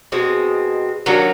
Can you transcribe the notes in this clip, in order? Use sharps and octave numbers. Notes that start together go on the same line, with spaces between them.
B2 G#3 C4
D#3 F#3 A#3 D4